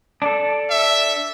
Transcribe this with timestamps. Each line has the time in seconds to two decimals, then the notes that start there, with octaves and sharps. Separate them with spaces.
0.22 D4 A4
0.70 E5